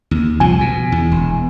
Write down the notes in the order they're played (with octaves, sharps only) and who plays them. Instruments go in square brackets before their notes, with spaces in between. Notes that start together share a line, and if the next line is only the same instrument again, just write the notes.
[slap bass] D#2
[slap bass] C2 F2 F3 [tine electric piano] G#5
[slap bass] B2
E2
E1